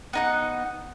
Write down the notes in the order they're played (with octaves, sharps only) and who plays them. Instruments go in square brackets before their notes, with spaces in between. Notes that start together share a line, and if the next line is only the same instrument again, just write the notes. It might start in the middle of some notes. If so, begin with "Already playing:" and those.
[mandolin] B3 D#4 F#5